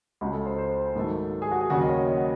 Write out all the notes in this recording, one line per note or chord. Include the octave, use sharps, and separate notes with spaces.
C#2 C#3 G#3 F#4
A4
C5
C5
G#2 D#3 F#3 A3
G#4
F#4
G#4
D#2 C#3 F#3 F#4
D#5
C#5
D#5
F#5